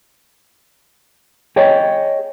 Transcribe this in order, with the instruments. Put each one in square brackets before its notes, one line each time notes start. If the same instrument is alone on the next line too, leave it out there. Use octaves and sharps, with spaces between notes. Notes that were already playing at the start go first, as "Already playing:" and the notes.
[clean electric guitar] G#4 C#5 D#5 G5